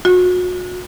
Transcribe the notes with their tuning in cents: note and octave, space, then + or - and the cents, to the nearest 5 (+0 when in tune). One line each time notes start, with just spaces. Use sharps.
F#4 -35